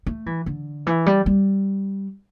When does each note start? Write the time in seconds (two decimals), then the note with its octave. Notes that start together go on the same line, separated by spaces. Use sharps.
0.06 A3
0.26 E3
0.46 D3
0.87 E3
1.06 G3
1.26 G3